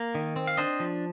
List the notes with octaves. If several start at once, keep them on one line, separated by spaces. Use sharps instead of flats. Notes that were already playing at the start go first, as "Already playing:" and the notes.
Already playing: A#3
D#3
C4
F5
D4 C5 D#5
F3